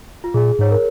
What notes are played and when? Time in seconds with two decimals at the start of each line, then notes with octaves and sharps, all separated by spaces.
0.24 F4
0.34 A#2 G#4
0.59 G#2 C#5
0.71 A#4